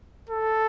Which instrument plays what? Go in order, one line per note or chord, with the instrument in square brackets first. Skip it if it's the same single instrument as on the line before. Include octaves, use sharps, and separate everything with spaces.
[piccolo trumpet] A4